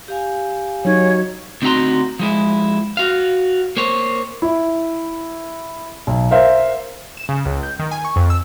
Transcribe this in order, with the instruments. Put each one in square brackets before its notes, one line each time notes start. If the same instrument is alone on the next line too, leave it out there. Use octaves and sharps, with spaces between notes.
[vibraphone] G4 F5 G#5
[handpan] F#3 D#4 [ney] C#5
[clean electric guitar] D2 C4 D#4 F#4 A#5 C6
F3 G#3 E4
F#4 F5
A#3 C5 C#5
[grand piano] E4
B1
A#4 C5 E5 F5
[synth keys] E7
C#3
C#2
G6
D#3
G#5
C#6
F2
E6